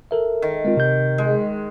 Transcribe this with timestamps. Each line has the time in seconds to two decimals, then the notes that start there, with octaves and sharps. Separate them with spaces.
0.11 A4 A#4 E5
0.42 D#3
0.65 G#3 C4 F4
0.77 C3 G6
1.18 G#3